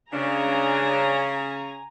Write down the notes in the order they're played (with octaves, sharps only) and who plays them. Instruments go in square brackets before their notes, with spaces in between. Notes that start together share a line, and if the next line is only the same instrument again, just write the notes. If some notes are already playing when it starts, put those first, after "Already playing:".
[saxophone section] C#3 [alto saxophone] D4 [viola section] G#5 A#5